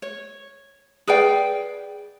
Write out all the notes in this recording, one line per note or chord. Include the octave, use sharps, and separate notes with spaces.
C#5
G#4 B4 D5 G5